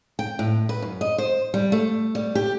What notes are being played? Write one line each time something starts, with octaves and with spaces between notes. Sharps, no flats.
G5
A2
B4
F#2
D#5
C5
G3
A3
G3
G4